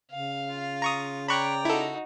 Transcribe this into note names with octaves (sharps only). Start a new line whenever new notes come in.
C#3 F5
F4
A#5 C#6 D#6
C#5 D5 G5 A#5 B5 C#6 F#6
D#4 E4 F#4 A4